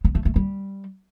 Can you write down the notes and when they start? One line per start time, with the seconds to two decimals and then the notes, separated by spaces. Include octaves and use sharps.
0.05 B3
0.15 A3
0.25 A3
0.36 G3